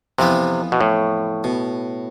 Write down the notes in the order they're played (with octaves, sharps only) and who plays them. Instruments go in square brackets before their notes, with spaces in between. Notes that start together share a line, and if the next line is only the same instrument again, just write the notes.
[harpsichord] F2 E3 B3 F4 B4 [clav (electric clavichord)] C3
[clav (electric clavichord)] B2
A2
[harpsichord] B2